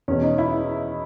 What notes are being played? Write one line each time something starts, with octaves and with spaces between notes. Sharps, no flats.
E2 B2 C#4
D#4
E4